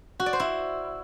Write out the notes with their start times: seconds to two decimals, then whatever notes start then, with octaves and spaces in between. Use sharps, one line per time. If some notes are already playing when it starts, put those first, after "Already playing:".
0.20 F#4
0.26 D5
0.33 C5
0.40 E4